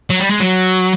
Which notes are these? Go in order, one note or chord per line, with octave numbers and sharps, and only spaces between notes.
F#3
G3
G#3
F#3